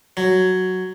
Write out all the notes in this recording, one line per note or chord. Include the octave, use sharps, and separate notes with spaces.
F#3